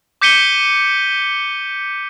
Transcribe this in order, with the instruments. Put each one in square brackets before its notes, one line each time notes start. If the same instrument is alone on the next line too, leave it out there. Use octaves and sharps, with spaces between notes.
[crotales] D6 G6 B6 C#7 D#7 G7